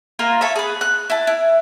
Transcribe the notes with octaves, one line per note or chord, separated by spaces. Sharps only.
A#3 F4 A#4
A4 C#5 E5
G#4 B4
F#6
E4 A5
E4